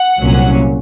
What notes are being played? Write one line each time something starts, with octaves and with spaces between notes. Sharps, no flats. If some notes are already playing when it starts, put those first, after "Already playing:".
Already playing: F#5
C2 A#2 F#3 C#4